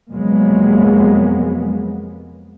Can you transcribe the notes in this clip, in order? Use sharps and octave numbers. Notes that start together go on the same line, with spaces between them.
F2 C3 F#3 G#3 A#3 B3